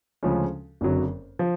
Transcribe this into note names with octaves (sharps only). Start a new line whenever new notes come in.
D2 C#3 F3 G#3 C#4
F#1 F2 D3 F#3
F3